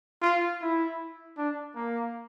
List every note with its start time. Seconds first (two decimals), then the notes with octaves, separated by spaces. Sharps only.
0.22 F4
0.62 E4
1.37 D4
1.76 A#3